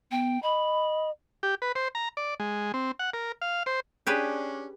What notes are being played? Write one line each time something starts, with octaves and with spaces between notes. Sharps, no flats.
B3 G5
D#5 B5
G4
B4
C5
A#5
D5
G#3
C4
F#5
A#4
F5
C5
C#4 D4 G4 G#4 B4